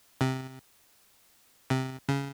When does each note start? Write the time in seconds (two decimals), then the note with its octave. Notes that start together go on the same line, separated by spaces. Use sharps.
0.21 C3
1.70 C3
2.09 C#3